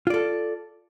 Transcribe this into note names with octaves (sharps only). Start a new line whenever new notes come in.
F4 A4 D5